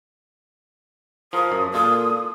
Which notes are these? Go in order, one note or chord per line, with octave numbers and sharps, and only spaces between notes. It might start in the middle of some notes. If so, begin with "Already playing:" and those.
F3 F4 A#4 D#6
F#2
A#2 F4 A4 D#6